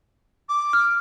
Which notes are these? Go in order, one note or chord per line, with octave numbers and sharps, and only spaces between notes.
D6
F6